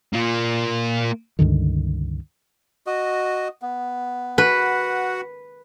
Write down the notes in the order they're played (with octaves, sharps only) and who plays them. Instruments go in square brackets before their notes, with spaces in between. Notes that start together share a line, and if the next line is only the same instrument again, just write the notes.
[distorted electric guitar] A#3 F4
[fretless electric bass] C#2 G2 D3 D#3
[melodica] F#4 D#5
B3
[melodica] F#4 F#5 [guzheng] B4